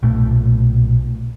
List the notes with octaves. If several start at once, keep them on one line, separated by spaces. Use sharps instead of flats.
B1 A#2 A3